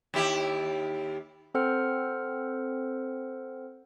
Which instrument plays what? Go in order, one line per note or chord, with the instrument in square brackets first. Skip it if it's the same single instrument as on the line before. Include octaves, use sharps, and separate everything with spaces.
[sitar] D#2 E4 G4
[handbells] C4 A4 C5 F#5 F6 C#7